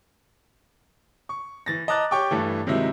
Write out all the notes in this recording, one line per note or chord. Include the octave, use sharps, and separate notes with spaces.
C#6
E3 A6 A#6
D#5 A5 A#5 D6 F#6 A6
G4 C#5 G5 C#6 D6
G2 E3 A3
C3 D#3 F#3 G#3 E4